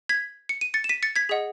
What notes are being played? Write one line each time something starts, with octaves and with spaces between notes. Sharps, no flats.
G#6 B6
C#7
D#7
A6 C#7
E7
B6 D#7
A6 C#7
G#6 B6
G#4 D#5 F#5